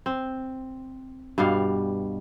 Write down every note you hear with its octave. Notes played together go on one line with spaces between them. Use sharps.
C4
G2 B2 G3 F5